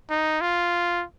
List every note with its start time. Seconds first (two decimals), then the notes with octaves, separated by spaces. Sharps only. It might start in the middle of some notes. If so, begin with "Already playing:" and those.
0.10 D#4
0.41 F4